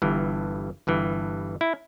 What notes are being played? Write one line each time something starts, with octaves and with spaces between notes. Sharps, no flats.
G1 G2 E3
G1 G2 E3
E4